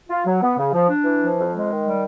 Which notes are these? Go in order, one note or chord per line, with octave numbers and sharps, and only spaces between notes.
F4
F#3
B3
C#3
F3
D4
E3
F3
F2
G#3
D#3
G3